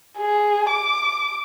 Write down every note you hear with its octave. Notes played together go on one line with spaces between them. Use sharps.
G#4
D6